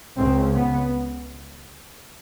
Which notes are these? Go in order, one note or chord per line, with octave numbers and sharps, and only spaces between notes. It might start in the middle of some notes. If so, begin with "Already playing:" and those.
C#2 C#3 C4
B3